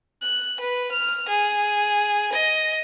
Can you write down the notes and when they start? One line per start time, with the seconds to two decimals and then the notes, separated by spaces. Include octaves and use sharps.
0.22 F#6
0.60 B4
0.91 F6
1.28 G#4
2.32 D#5